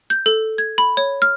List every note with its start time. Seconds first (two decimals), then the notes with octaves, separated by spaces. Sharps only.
0.10 G6
0.26 A4
0.58 G#6
0.78 B5
0.97 C#5
1.22 F6